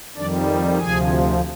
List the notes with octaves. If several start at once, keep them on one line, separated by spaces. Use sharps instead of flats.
F2 D#3 G3 D4 D5
D2 C3 F3 G#4 G#5